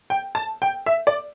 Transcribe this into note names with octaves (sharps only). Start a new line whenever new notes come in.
G5
A5
G5
E5
D5